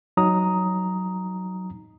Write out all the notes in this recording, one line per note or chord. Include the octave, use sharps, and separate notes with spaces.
F#3 D#4 A#5 D#6